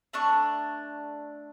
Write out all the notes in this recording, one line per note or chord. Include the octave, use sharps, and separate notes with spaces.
A3 D4 C#6